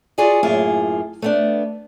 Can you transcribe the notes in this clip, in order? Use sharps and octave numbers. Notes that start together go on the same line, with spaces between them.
F4 F#4 G#4 D5 D#5
F#2 A2 A#3 F4 G#4
A3 B3 D4